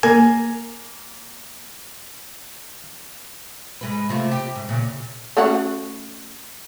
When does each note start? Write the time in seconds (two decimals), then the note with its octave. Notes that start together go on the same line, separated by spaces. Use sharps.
0.03 A#3 G#5
3.81 G#2 G#3 B4
4.09 C3 A3 F4
4.31 G4
4.55 G#2
4.67 E2 A#2 C#3
5.37 A3 C#4 F#4